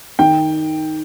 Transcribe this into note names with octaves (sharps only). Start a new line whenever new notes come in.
D#3 G5